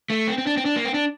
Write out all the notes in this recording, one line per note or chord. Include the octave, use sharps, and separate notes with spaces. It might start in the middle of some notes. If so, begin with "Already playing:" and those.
A3
C4
C4
D4
C4
D4
A#3
C4
D4